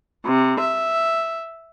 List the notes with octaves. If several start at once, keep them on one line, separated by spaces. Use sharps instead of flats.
C3
E5